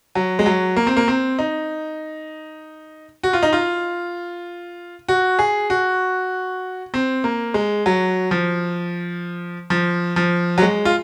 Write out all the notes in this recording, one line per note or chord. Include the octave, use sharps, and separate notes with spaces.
F#3
G#3
F#3
A#3
C4
A#3
C4
D#4
F#4
F4
D#4
F4
F#4
G#4
F#4
C4
A#3
G#3
F#3
F3
F3
F3
F#3
G#3
F4